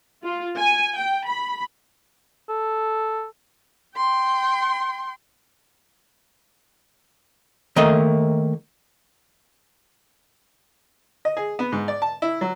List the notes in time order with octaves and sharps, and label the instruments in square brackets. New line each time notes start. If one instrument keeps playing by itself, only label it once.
[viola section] F4
G#5
G5
B5
[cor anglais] A4
[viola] G5 C6
[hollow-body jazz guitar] D#3 A3 A#3 D#5
[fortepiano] D#5
G#4
B3
G#2
D5
A5
E4
F#3